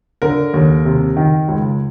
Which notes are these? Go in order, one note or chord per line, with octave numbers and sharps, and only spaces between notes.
D3 A#4
D#2
C3
D#3
C#2